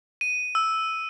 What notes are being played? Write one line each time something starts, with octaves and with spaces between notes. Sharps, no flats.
D#7
E6